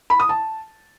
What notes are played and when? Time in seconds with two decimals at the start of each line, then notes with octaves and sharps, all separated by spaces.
0.10 B5
0.20 D#6
0.29 A5